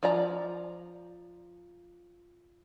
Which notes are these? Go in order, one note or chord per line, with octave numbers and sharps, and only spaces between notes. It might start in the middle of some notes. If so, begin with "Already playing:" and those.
F3 D5 A#5